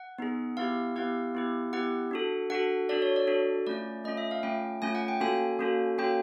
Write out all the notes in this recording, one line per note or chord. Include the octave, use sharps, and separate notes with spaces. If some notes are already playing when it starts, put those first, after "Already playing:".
Already playing: F#5
B3 D#4 G#4
B3 E4 G4 F5
B3 E4 G4 F5
B3 E4 G4
B3 E4 G4 F#5
D4 F#4 A4
D4 F#4 A4 F#5
D4 F#4 A4 D5
C#5
D5
D4 F#4 A4
A3 C#4 F4 D5
A3 C#4 F4 D#5
E5
F5
A3 C#4 F4 G5
A3 C#4 F4 G#5
F#5
G5
A#3 C#4 F#4 A4 G#5
A#3 C#4 F#4 A4
A#3 C#4 F#4 A4 G5